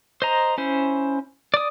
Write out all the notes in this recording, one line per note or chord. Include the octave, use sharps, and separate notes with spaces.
C5 D#5 A#5
C#4 E4 C5
D5 D#6